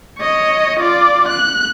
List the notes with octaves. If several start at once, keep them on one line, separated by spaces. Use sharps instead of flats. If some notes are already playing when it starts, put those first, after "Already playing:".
C#5 D#5
F4 D5
F#6